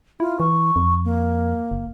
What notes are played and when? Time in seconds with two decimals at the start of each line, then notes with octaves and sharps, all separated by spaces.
0.20 E4 F4
0.40 E3 C#6
0.76 F2
1.04 A#3
1.71 F#1